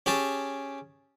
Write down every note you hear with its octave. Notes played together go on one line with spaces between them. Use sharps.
C#4 G4 G#4 A5